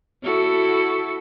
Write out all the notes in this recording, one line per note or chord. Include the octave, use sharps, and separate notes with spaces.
E4 F#4 A4